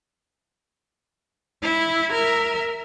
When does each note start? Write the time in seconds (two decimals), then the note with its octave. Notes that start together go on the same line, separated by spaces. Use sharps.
1.62 E4
2.12 A#4 E5